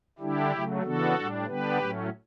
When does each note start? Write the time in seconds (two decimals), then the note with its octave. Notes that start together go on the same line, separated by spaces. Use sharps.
0.19 D3 G3 D4 E4 G4
0.51 C#3 F#3 A3
0.83 C#3 E3 B3 D4 F#4 A4
1.14 A2 G3 D4
1.46 D3 G3 B3 D4 G4 B4
1.78 A2 F#3 A3 C#4